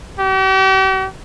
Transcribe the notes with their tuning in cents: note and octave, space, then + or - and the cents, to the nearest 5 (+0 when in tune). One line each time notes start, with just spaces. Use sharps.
G4 -45